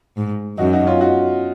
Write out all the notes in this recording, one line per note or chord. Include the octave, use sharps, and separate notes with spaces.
G#2
F#2 D#4 F#4
D#4 F#4
C#4 F4
D#4 F#4